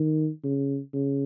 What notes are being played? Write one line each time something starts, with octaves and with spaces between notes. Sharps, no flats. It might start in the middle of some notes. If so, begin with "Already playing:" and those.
Already playing: D#3
C#3
C#3